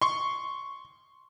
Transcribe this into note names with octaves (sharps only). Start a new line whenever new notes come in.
C6 C#6